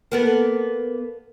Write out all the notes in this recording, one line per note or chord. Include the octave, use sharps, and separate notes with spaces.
A#3 B3 A4